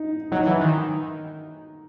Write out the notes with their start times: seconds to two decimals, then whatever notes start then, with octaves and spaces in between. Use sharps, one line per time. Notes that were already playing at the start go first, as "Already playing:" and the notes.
Already playing: D#4
0.32 F#3 D#4
0.46 E3
0.61 D#3